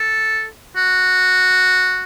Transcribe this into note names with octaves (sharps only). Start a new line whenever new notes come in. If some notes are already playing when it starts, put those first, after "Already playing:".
Already playing: A4
F#4